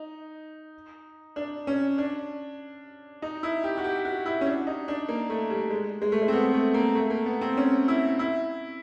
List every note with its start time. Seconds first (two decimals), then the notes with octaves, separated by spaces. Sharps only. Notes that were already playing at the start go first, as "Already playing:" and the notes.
Already playing: D#4
1.36 D4
1.67 C#4
1.98 D4
3.22 D#4
3.43 E4
3.64 G4
3.78 F#4
3.84 G4
4.05 F#4
4.26 E4
4.41 C#4
4.47 D4
4.67 D#4
4.88 D4
5.08 A#3
5.30 A3
5.50 G3
5.70 G#3
6.02 G#3
6.12 A3
6.22 G#3
6.28 C4
6.33 B3
6.54 A3
6.74 A#3
6.95 A3
7.10 A#3
7.26 B3
7.41 C4
7.57 C#4
7.88 E4
8.19 E4